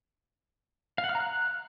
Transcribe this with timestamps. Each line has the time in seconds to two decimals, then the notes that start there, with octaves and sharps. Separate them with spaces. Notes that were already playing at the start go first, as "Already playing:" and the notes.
0.98 F5
1.04 F#5
1.09 F6
1.15 A#5
1.20 F#6